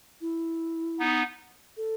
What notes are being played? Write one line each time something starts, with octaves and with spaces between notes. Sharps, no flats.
E4
B3 D#4
A4